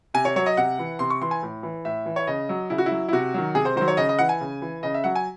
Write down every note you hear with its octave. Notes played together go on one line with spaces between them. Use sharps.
C3 G#5
C#5
F#3 C#5
D#5
C3 F#5
E3
C3 C6
C#6
E3 C6
G#5
A2
E3
A2 E5
E3
C#5
C#3 D#5
F#3
C#3 E4
F#4
E4
F#3
E4
C3 F#4
D#3 F#3
C3 G#4
C5
D#3 F#3 C5
C#5
C#3 D#5
D#5
E3 F#5
G#5
C#3
E3
C#3 D#5
E5
F#3 F#5
G#5